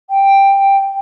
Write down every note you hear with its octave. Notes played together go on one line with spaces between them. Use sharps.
G5